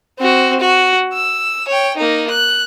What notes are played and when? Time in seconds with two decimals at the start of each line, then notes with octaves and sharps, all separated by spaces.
0.19 C4 F#4
0.60 F#4
1.14 E6
1.68 C#5 G5
1.97 A#3 D#4
2.30 F#6